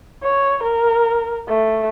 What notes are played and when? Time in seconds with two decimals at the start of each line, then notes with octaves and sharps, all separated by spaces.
0.23 C#5
0.63 A#4
1.48 A3